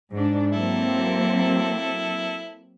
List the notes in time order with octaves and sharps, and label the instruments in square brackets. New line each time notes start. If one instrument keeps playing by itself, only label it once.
[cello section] G#2 D4
[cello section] F#3 A#3 C4 [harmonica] E4 A4